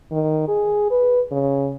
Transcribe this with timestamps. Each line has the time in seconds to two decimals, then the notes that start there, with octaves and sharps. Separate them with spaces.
0.12 D#3
0.48 G#4
0.91 B4
1.31 C#3